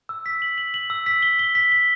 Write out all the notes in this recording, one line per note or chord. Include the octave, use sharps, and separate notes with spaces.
E6
B6
F#7
F#7
F#7
E6
B6
G7
G7
B6
G7